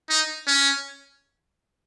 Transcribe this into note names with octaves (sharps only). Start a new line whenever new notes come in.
D#4
C#4